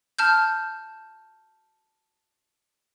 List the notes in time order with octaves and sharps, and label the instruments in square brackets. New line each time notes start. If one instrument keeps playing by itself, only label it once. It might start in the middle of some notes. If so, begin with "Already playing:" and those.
[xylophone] A5 F6 G6